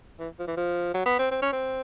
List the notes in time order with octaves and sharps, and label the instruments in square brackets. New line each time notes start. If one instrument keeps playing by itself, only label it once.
[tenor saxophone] E3
F3
E3
F3
F#3
B3
C4
C4
C#4
C4